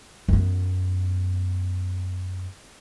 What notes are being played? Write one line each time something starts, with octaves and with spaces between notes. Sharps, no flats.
F#2 B3